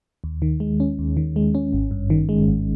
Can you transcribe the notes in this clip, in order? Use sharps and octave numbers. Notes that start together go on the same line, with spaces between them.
D#2
D#3
G#3
C#4
D#2
D#3
G#3
C#4
G#1
G2
D#3
G#3
G#1